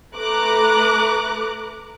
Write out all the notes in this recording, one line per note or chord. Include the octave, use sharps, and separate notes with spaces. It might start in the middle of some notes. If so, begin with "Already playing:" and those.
A3 B4 A#5 D6 F#6